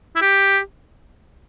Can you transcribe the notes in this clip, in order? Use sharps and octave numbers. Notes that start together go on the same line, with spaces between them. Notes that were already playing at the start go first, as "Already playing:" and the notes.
E4
G4